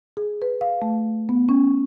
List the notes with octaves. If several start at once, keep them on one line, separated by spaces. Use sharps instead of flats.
G#4
B4
F5
A3
B3
C#4